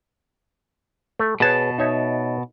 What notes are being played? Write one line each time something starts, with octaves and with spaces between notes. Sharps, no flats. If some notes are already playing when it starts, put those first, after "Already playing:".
A3
B2 G#4 B4 C#5 A5
D#4 C#5 E5